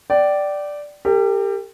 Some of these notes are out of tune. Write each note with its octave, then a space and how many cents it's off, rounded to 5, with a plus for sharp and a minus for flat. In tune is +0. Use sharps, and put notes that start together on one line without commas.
D5 +0 G5 -30
G4 +15 A#4 -45